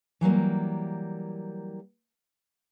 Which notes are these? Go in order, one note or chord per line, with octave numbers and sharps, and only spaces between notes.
E3 F#3 G3 A#3